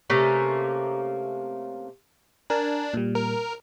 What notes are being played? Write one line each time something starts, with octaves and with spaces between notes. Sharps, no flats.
C3 A3 A#3 C#4
D4 A#4 G#5 A5
A#2 G3
A#4